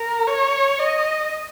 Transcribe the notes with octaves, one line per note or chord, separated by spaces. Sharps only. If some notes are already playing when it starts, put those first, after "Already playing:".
Already playing: A#4
C#5
D#5